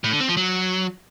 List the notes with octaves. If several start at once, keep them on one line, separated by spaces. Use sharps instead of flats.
A2
D3
C4
F3
F#3